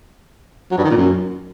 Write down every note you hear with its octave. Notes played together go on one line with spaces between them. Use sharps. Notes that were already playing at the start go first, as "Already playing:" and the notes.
F#3
G2
D#3
A#2
F#2